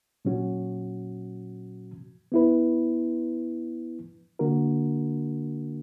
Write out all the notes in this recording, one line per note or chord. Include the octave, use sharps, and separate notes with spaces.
A#2 F#3 C#4 F#4
B3 E4 B4
D3 A#3 D4 F#4 A#4